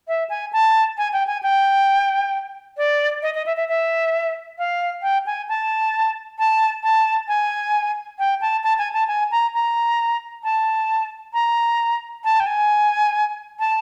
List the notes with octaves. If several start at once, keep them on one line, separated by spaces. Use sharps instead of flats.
E5
G#5
A5
G#5
G5
G#5
G5
D5
D#5
D#5
E5
E5
E5
F5
G5
G#5
A5
A5
A5
G#5
G5
A5
A5
G#5
A5
G#5
A#5
A#5
A5
A#5
A5
G5
G#5
A5